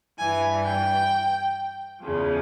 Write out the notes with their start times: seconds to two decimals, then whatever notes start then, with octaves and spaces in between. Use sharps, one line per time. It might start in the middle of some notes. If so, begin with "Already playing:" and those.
0.18 G2 E3 G#5
0.64 G5
2.00 E2 C#3 F3